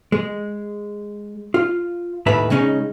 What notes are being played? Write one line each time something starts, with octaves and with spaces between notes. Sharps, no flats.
G#3
F4
D#2 A2 D#3 B4 E5 B5
C#3 G#3 C#4 D#4